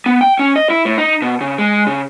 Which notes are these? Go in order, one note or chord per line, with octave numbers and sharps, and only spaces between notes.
B3
G5
C#4
D#5
E4
A2
D#4
B2
C#3
G#3
C#3